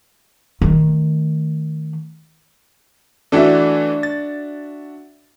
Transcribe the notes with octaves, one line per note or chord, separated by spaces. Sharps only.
D#3 A3
E3 A3 D4 F#4 A4 E5
A6